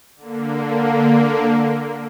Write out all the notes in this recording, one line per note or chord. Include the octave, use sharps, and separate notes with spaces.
D3 A#3